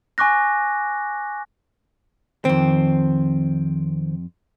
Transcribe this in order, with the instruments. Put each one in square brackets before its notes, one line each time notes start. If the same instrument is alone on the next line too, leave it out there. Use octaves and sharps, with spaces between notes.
[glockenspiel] G#5 C#6 D6 F#6 A#6
[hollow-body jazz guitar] F2 C4 [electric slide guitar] D#3 C5